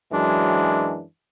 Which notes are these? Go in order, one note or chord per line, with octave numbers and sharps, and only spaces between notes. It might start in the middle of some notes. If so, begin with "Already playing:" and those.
F#2 E3 F#3 G#3 D4